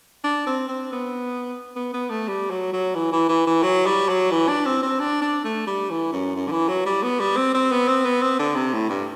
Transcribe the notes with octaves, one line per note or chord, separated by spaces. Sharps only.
D4
C4
C4
B3
B3
B3
A3
G3
F#3
F#3
E3
E3
E3
E3
F#3
G3
F#3
E3
D4
C4
C4
D4
D4
A3
G3
E3
F#2
F#2
D3
E3
F#3
G3
B3
G3
C4
C4
B3
C4
B3
C4
D3
C3
A2
G2